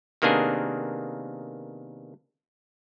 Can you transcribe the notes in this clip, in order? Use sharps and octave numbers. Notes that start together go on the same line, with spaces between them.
C3 D#3 A#3 B3 D4 G#4